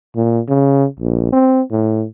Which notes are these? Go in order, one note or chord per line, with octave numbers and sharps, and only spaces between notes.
A#2
C#3
A#1
C4
A2